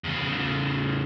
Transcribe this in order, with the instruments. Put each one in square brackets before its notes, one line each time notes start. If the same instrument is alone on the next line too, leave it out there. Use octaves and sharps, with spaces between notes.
[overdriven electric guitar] E2 C#3